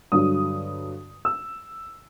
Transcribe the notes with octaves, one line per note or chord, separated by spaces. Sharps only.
G2 D3 F#3 D#6
E6